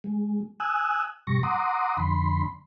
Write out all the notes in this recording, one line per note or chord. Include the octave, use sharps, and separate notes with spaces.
G#3
G#5 D#6 E6 F#6
G2 B2 G3 C#6 A#6
F#5 A#5 C6 D6 D#6
F2 D3 B5 C6